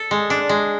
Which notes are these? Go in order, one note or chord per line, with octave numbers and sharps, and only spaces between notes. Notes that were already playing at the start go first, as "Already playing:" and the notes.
Already playing: A4
G#3
D4
G#3